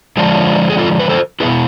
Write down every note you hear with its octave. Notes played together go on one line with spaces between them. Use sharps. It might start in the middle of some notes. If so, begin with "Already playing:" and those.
D3 F3 G#3 D4 F4
G#4
F4 A4
B4
A4 C5
B2 B3 E4 G#4 B4